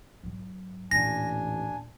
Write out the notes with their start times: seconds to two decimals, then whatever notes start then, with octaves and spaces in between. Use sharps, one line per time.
0.23 G#2 F#3
0.91 A1 D#2 A#2 D4 G#5 A#6